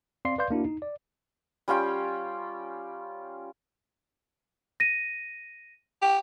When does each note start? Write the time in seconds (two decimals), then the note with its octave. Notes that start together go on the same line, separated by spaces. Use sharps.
0.25 C4 D5 F5 C6 C7
0.38 B4 D5 F5 C6 G6
0.50 A#3 D4 E4 F#4
0.65 D#4
0.82 D5
1.68 G3 C#4 F4 G5
4.80 A#6 D#7
6.02 G4